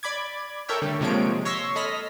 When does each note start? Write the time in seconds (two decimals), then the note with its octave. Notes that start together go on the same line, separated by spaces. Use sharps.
0.03 D5 B5 D6 G#6
0.69 A4 A#4 C#5 E5 G5
0.82 D3 G3 A3
1.01 C3 F3 G#3 A#3 C#5 D7
1.45 C#5 C6 C#6 E6 A#6 B6
1.76 A4 D#5 B5 F6 A#6 B6